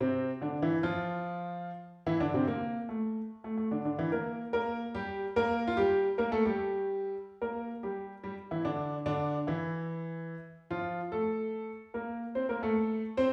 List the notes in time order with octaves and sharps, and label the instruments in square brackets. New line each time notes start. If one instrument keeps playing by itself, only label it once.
[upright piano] C3 C4
D3 D4
E3 E4
F3 F4
E3 E4
D3 D4
C3 C4
A#3
A3
A3
A3
D3 D4
D3 D4
E3 E4
A#3 A#4
A#3 A#4
G3 G4
A#3 A#4
F4
G3 G4
A#3 A#4
A3 A4
G3 G4
A#3 A#4
G3 G4
G3 G4
E3 E4
D3 D4
D3 D4
E3 E4
F3 F4
A3 A4
A#3 A#4
C4 C5
A#3 A#4
A3 A4
C4 C5